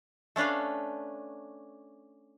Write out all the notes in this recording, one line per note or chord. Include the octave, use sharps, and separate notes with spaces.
A3 C#4 D4 B4 F5